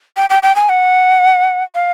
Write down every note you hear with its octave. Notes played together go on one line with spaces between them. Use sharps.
G5
G5
G5
G#5
F#5
F5